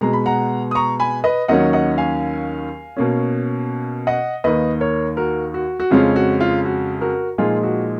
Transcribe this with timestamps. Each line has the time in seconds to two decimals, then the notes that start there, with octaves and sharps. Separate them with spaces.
0.01 B2 G#3 B3 A#5
0.13 B5
0.26 F#5 A#5
0.71 D#6
0.75 A#5 C#6
1.00 G#5 B5
1.24 B4 D#5
1.48 D#2 D#3 F#3 C#4 D#5 F#5
1.73 D#5 F#5
1.98 F5 G#5
2.97 B2 A#3 C#4
4.07 D#5 F#5
4.44 D#2 D#3 A#3 B4 D#5
4.80 A#4 C#5
5.17 F#4 A#4
5.54 F#4
5.80 F#4
5.91 F2 C#3 G#3 C#4 F4
6.16 F#4
6.41 F4
6.65 F#4
7.01 F#4 A#4
7.38 A#2 F3 G#3 D#4 F4 G#4
7.63 F#4